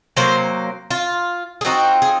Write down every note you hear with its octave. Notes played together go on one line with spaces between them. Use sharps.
C3 F#3 A#3 C5
F4
G#4
F3 C4 D#4 F#4
G#4